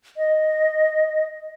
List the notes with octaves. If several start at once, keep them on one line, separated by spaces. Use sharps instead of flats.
D#5